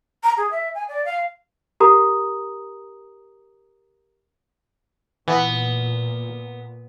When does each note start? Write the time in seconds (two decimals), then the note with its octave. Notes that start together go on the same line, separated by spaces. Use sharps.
0.23 A#5
0.37 G#4
0.51 E5
0.75 G#5
0.89 D5
1.05 F5
1.80 G4 A#4 A#5 D#6
5.28 A#2 E3 B3